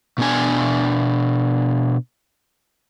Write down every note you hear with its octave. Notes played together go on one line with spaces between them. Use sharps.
B2 B3 D4 G#5